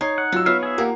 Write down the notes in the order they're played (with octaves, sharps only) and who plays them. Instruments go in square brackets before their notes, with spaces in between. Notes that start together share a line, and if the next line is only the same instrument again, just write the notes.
[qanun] D#4 [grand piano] C#5 G#6 C7
[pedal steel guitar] F#5
[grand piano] F#3 E6 [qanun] F4
[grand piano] B3 B4 C#5 [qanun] F4 [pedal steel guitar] E5 F5
[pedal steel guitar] G#4 E5
[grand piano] A#3 G4 F#5 [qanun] A#4